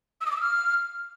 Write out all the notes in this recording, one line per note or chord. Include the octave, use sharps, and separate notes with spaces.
E6
D#6
D6
E6
F6